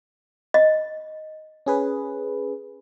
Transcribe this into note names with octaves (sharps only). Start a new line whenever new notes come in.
D#5
C#4 G#4 B4